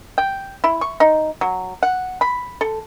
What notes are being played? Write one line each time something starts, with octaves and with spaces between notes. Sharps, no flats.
G5
E4
C#6
D#4
F#3
F#5
B5
A4